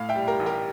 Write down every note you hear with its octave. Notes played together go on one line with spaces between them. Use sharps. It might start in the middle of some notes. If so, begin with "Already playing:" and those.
Already playing: A2 F5
E5 G5
G3
G4 A#4
A1
G4 A#4